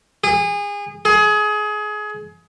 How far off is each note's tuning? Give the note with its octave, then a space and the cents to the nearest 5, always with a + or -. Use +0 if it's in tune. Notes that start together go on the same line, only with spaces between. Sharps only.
G#4 -30
G#4 +25